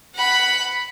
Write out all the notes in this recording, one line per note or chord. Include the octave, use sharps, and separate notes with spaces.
F#5 B5